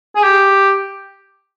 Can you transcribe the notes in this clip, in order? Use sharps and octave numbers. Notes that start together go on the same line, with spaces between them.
G#4
G4